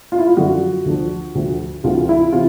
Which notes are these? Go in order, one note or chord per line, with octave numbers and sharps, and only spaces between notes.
F4
E4
F4
F#2 D3 F3 F#4
D2 D3 F3
D2 D3 F3
D2 C3 E3 F4
E4
C3 E3 F4